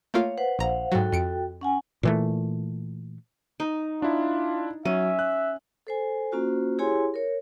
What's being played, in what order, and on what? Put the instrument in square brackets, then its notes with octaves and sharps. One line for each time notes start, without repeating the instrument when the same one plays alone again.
[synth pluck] A3 A#3 F4 [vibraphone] C#5 F5
[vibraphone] B4 C5 F#5
[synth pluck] A#1 A#5 [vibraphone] C5 F5 F#5
[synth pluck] G#2 F#3 [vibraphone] F#4 A4 G5
[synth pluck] F2 C#7 D7
[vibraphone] C#4 F#5 G#5
[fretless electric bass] A#2 E3 A3
[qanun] D#4
[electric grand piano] D4 E4 [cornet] F4
[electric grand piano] F#3 [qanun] C#4 [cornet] E5
[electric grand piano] F#6
[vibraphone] A4 C5 G#5
A#3 C#4 F4 F#4 C5
E4 G4 G#4 C#5 G#5 C6
A#4 C#5